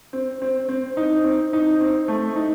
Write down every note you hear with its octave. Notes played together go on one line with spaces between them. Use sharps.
C4
C4
C4
D#4
C4
D#4
C4
A3
D#4